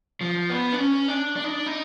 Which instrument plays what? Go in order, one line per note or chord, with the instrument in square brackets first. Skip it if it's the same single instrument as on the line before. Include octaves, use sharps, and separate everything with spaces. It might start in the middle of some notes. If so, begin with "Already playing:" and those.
[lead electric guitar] F3
B3
D4
C#4
D4
D4
D#4
D4
D#4